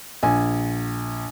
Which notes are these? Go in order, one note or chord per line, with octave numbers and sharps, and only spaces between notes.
A#1 G#5